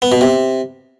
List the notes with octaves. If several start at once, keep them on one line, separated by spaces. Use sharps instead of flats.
B3
B2
C3